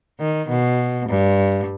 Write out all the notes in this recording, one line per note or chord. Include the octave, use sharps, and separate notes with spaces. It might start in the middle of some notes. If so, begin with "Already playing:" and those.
D#3
B2
G2